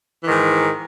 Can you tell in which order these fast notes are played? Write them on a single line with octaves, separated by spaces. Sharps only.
E3 D#3 G#2